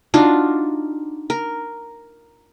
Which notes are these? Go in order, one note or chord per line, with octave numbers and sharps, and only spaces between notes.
D4 D#4 F4 F#4
A#4